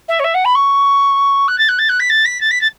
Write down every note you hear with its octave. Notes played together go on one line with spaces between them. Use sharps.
E5
C#5
E5
F#5
B5
C#6
F#6
A6
F#6
A6
F#6
B6
A6
B6
A6
B6
A6